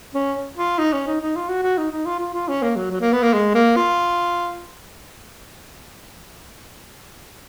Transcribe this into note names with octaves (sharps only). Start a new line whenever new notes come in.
C#4
F4
D#4
C#4
D#4
D#4
F4
F#4
F#4
D#4
D#4
F4
F4
F4
C#4
A#3
F#3
F#3
A#3
B3
A#3
G#3
A#3
F4